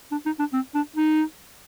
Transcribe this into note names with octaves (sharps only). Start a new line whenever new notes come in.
D4
D#4
D4
C4
D4
D#4